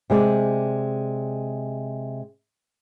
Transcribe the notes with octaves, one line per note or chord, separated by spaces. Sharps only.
C3 G#3 D5